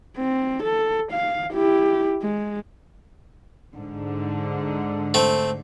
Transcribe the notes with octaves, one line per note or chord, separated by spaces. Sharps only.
C4
A4
F5
E4 G4
G#3
G#2 D3
A3 C4